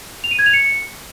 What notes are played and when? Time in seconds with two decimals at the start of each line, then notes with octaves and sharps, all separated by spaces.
0.24 F7
0.31 D#7
0.39 G#6
0.46 F7
0.53 C#7